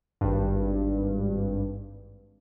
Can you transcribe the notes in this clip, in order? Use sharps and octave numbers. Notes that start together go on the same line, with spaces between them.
G#1 G2